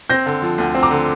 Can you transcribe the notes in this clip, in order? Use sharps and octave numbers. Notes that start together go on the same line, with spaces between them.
C4 G6 A#6
D3
F3
D2
C4
A#5 D6
D3